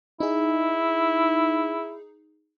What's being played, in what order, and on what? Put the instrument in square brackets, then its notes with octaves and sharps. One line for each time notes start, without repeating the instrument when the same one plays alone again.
[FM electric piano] D#4 G#4 [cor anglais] E4